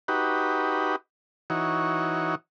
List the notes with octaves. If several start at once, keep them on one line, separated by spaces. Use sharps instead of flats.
D#4 F#4 G4 B4
E3 D#4 F#4 C#5